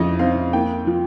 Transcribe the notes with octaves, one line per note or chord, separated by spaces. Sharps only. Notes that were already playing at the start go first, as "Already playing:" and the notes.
Already playing: F2 C#3 D#5
C4 F5
A#3 G5
F3